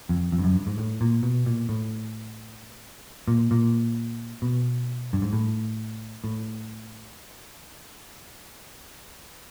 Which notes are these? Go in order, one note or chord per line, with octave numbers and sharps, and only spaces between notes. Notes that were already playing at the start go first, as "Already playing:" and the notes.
F2
F2
G2
F#2
G2
G#2
A2
A#2
B2
A#2
A2
A#2
A#2
B2
G2
G#2
A2
A2